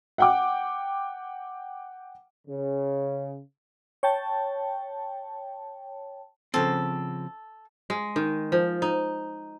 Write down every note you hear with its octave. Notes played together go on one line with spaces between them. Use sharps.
F#5 G5 D6
C#3
C#5 G5 A5
C#3 F3 C4 A4
G#3
D#3
F3
D#4